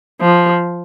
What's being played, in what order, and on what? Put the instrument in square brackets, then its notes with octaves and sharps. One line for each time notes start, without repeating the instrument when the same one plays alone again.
[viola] F3